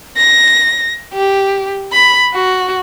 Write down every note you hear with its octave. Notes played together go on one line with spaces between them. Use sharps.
A#6
G4
B5
F#4